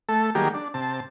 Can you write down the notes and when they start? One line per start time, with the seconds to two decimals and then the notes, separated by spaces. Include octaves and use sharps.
0.09 A3 A4
0.35 D#3 F#3 G3 A#3 G4 G#4
0.54 D4
0.74 C3 A5